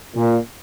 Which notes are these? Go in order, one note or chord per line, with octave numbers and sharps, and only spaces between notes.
A#2